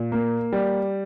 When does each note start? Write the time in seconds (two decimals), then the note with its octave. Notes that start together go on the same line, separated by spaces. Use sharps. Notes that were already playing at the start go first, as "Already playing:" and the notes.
Already playing: A#2
0.12 A#3
0.53 G3